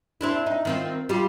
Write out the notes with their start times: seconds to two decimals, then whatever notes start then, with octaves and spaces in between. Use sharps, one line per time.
0.21 C4 D4 E4
0.46 D#4
0.65 D#3 C4 F4
1.09 G3 F4 G4